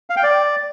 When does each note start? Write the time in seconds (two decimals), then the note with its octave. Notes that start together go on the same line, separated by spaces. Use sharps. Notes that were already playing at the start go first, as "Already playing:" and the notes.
0.10 F5
0.17 G5
0.23 D5